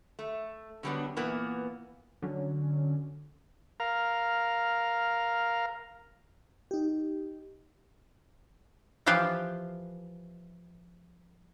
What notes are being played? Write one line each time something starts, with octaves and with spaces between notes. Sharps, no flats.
A3
D3 F#3 G3 A3 B3 D4
A#2 E3 A#3 B3
D3 F#3 C#4
A#4 F5
D#4 G4
E3 F3 F4 G4 B4